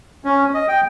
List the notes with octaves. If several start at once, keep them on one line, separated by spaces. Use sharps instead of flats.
C#4
D#5
G5